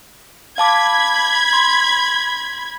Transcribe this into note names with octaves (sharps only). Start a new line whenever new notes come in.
F5 A5 B5 D6 G#6
C6